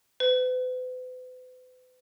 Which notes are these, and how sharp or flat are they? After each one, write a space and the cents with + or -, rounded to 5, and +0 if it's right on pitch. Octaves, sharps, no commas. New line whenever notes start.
B4 +45